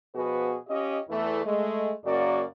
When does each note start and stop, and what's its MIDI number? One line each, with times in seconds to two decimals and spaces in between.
0.15 0.56 47
0.15 0.56 53
0.15 0.56 59
0.15 0.56 66
0.15 0.56 68
0.15 0.56 71
0.68 0.98 61
0.68 0.98 65
0.68 0.98 67
0.68 0.98 75
1.10 1.44 40
1.10 1.44 52
1.10 1.44 57
1.45 1.91 56
1.45 1.91 57
2.04 2.43 42
2.04 2.43 49
2.04 2.43 58
2.04 2.43 66
2.04 2.43 74